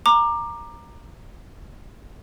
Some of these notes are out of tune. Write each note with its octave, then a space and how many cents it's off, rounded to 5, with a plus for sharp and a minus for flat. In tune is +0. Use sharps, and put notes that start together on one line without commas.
A#5 +0 D6 +20